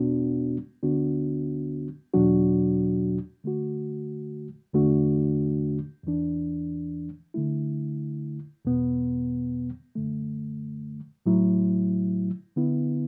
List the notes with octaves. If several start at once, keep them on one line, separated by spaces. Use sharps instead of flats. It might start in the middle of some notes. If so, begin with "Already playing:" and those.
Already playing: E2 B2 B3 D4 F#4
D2 D3 B3 D4 F#4
E2 B2 F#3 D4 F#4
D3 A3 F#4
E2 D3 A3 D4 F#4
E2 E3 D4
D3 A3 E4
E2 B2 B3
F#2 D3 A3
A2 F#3 A3 E4
D3 B3 E4